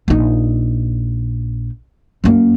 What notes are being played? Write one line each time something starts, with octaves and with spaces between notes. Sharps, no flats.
A#1 D#4
F#2 A#3